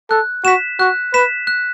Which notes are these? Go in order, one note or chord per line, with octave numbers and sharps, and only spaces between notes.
A4 F#6
F#4 B6 E7
F#4 F#6
B4 B6 E7
F#6